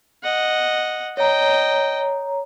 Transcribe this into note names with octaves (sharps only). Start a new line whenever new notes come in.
D#5 F#5
C#5 D#5 G5 A#5